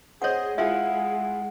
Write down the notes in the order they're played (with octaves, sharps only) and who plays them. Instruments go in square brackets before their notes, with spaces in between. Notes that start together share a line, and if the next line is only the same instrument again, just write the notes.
[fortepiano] C4 C5 D#5 [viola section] G#4 [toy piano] C#5 F#5
[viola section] G#3 [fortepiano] E4 F4 G#4 [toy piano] E5 [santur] F#5